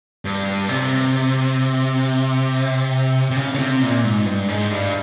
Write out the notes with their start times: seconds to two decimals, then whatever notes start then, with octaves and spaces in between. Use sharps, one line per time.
0.25 G2
0.69 C3
3.31 C3
3.36 C#3
3.54 C#3
3.59 C3
3.82 A#2
4.04 G#2
4.26 G2
4.49 G#2
4.71 G2